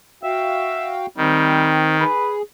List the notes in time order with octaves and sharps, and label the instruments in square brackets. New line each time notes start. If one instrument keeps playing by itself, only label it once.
[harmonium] F#4 F5 G5 [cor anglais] E5
[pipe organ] D#3 [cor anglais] G3 [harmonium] C4
[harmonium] G#4 [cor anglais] B4